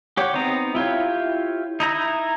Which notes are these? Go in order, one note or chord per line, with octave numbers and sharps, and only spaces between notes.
G4 C#5 F#5
B3 C4 D#4 A#5
E4 F4 G4 C#5
D#4 E4 A#5